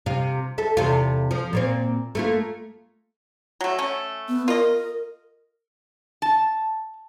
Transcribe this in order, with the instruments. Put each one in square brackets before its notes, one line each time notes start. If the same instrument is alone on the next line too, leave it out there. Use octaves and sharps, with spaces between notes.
[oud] C3 F4
A4 E5
E2 C3 F4
F3
A#2 A#3 C4
A3 A#3 F4
[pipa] F#3 A3
A3 C#4
[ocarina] B3
[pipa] F4 D#5 [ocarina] A#4
[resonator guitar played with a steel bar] A5